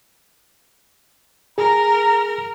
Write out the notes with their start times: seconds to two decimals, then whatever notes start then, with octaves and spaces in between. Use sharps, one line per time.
1.58 G#4 A#4 A#5